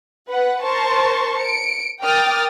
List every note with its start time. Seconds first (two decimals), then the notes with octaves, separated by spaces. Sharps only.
0.28 B4 F#5
0.63 A#4 C5 A5 C6 C#6
1.39 C#7 D7
2.01 A#4 G5 D6 D#6 F6 A6